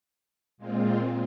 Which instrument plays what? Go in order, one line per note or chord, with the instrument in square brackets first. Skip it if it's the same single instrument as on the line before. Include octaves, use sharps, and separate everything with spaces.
[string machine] A#2 G#3 C4 F4